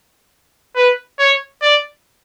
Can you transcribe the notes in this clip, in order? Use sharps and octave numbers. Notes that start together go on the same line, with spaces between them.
B4
C#5
D5